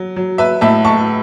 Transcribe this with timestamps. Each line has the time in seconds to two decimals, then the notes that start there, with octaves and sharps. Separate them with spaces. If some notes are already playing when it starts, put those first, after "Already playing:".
Already playing: F#3
0.16 F#3
0.38 B4 E5
0.61 A2 E5 A5
0.85 A5 C#6